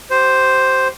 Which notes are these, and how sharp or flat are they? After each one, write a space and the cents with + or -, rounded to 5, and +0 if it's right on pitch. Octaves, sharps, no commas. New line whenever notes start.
G4 -40 C5 +0